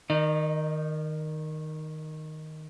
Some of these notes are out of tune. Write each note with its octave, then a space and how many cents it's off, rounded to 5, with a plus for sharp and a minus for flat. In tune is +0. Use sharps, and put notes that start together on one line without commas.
D#3 +0 D#4 +0 D#5 -40